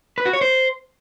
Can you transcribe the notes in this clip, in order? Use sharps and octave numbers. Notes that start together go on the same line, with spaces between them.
B4
F#4
C#5
C5